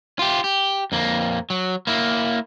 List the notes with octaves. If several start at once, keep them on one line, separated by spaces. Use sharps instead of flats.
F4 G4
G4
F2 A#3
F#3
A#3 E4